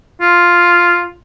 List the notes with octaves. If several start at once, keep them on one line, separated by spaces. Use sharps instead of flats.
F4